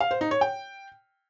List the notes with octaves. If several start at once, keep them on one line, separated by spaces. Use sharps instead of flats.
F5
C5
D#4
C#5
G5